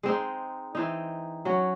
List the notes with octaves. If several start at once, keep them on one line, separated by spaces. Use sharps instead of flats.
G#3 C4 D#4
E3 C4 D#4
F#3 C#4 F#4